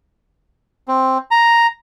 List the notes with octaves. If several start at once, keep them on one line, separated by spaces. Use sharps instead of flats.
C4
A#5